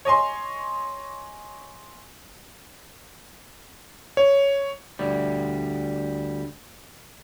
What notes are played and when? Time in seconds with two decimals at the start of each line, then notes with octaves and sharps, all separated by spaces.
0.05 C#5 D#5 G#5 C6
4.17 C#5
4.99 D2 G3